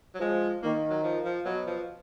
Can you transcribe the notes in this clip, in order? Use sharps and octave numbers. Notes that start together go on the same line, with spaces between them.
F#3
F3 G#3
D#3 A#3
F#3
F3
F3
B2 F#3
F3